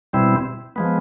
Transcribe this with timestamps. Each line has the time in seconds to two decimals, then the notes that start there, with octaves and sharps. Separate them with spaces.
0.13 B2 G3 C4 E4
0.76 F3 G#3 B3